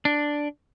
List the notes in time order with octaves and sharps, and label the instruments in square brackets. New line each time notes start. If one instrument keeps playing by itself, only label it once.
[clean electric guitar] D4